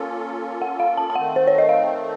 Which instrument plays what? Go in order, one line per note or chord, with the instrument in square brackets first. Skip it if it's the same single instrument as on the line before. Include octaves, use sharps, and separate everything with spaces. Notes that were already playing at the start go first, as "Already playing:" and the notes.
Already playing: [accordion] A#3 C#4 F4 A4
[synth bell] F#5
F5
A5
A5
[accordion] D#3 A3 C4 [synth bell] F#5
[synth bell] C5
C#5
D#5
F5